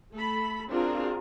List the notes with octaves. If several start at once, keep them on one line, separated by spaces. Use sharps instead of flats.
A3 A4 B5
C4 D4 F4 F#4 G#4 A#4